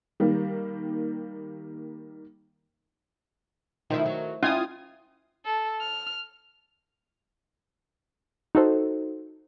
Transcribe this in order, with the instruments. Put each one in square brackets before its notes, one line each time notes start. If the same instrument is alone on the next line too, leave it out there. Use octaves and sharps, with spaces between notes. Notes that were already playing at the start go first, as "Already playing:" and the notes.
[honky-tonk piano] D#3 G3 A#3
[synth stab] D#3 [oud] F3 A3 E4
[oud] F#3
[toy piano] C#4 [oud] E4 [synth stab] F4 G#5 D#6
[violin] A4
F6
[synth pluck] D#4 F#4 A4 C5